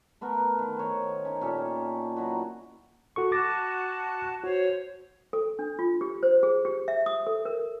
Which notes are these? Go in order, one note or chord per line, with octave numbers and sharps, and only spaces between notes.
A3 B3 A4 A#4
D#3
C5 C#5 D#5
C#4 D#4
A#2 C#4 G4 A4
F#3 D#4 E4 F#4
F#4 A4 C#6
F#4 A5 D6 A6 A#6
F#4 C5 C#5
A4
D4
F4
G4
C5
G#4
G4
E5
D#6
A4
A#4